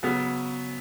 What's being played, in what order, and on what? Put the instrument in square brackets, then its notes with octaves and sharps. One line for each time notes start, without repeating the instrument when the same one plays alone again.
[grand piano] C#3 F#3 B3